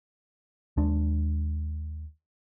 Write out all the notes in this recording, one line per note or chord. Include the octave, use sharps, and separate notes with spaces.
D#2 G#3 D4